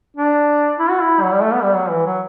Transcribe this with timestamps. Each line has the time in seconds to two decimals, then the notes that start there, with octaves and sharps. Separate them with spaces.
0.16 D4
0.79 E4
0.90 F#4
1.00 E4
1.21 F#3
1.32 G3
1.43 A3
1.53 B3
1.63 G3
1.74 F#3
1.90 E3
2.06 F#3